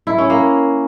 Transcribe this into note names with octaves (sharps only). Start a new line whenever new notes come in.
E4
C#4
A#3